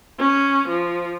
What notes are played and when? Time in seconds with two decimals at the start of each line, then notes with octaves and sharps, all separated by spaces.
0.19 C#4
0.68 F3